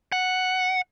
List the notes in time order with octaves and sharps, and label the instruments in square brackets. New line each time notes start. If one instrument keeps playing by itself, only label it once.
[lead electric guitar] F#5